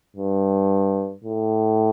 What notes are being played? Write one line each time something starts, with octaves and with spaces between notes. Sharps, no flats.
G2
A2